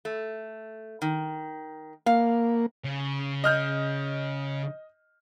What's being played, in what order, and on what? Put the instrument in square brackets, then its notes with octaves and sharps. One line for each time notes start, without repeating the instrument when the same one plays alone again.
[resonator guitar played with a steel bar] A3
D#3
[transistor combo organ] A#3 [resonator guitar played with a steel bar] F5
[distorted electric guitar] C#3
[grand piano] D#5 F6 G6